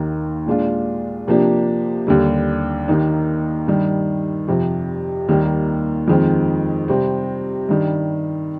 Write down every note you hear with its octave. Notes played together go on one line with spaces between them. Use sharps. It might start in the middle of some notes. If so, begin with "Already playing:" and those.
Already playing: D#2 D#3 A#3
A#2 G#3 D4 F4
C3 F3 A#3 D4 G4
D#2 D3 G3
D#2 D#3 A#3 D#4
G2 D#3 G3
F2 C3 F3
D#2 D#3 G3 A#3
F2 D#3 G#3 C4
C3 G3 C4
G2 D#3 G3